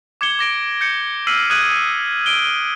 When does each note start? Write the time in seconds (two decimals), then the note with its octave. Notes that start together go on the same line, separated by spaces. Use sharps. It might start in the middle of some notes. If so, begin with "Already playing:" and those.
0.21 D6 G#6 C#7 G7
0.39 D6 A#6 D7
0.81 G6 C#7
1.27 E6 F6 B6 C7 D#7 F#7
1.50 D#6 F#6 G#6 D#7 F#7
2.26 D7 D#7 G7